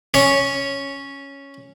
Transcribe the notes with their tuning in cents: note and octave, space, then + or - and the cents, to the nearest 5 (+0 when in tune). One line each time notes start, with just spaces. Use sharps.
C#4 +0 C#5 +0